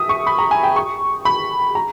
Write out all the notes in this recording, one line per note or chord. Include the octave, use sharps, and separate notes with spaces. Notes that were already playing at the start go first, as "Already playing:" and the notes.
Already playing: E5 D#6
C#6
B5
A#5
G#5
G5
C#6
B5
A#5